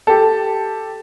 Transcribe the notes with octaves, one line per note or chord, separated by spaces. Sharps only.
G4 A4